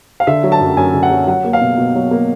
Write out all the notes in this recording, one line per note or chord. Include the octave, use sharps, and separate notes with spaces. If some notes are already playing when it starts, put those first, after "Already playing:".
F5
D3 E5
F#3
A5
F#2
F#2 G#5
D3
F#5
F#3
F#3 F#5
A#3
F5
B2
B2
F#3
A#3